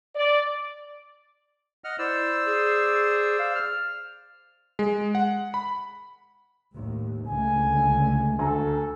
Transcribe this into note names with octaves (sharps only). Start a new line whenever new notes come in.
D5
D#5 F#5 F6
E4 C5 D5 E6
G#4
F5
F6
G#3
F#5
B5
D#2 A2
C#2 D3 A3 G#5
D2 A4 G#5 A#5